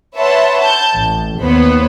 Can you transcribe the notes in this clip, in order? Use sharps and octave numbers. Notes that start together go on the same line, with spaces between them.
B4 C#5 E5 F#5 A5 C6
A5 G6
A1
D#2 B3 C5 C#5 B5